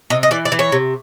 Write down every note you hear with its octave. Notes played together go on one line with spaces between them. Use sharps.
C3 D#5
D#5
E3 D5
D5
E3
C#5
C3